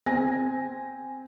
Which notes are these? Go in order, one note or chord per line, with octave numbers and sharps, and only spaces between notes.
C4 G#5 A#6